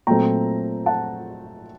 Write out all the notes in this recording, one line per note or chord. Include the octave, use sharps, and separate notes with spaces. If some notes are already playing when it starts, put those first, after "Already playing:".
A#2 F#3 A3 C4 G5 A#5
F#5 A5